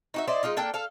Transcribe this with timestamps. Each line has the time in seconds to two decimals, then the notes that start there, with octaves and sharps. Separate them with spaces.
0.14 D#4 F#4 E5
0.28 E4 C5 D5 D#5
0.43 G#3 D#4 F4 D#5
0.57 A#3 D4 A4 G5
0.74 A4 F5